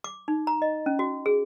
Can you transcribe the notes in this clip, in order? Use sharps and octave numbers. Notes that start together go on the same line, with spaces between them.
D6
D#4
A#5
D#5
C#4
F#4
G#4